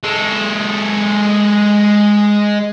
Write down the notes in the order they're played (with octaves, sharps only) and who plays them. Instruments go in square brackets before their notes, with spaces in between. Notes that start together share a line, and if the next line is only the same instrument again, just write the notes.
[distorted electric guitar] G#3 A4